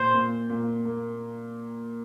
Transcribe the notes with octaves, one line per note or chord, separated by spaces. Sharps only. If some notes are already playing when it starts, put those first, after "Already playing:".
Already playing: A#2 A#3 C5
A#2
A#2
A#3